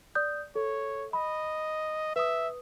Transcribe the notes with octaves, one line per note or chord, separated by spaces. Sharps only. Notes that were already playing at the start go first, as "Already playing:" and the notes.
D5 D#6 G6
A4 C#5
D#5 B5
B4 E5 D#6